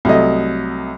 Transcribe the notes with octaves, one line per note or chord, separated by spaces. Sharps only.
C2 F#3 A3 D#5